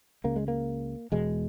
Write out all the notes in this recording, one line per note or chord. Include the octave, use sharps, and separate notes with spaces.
C#2 C#3 A#3
G#3
A#3
E1 E2 B2 G#3